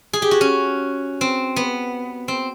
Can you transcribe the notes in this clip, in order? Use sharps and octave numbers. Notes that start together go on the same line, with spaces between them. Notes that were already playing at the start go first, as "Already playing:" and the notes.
G#4
G4
F#4
C#4
C4
B3
C4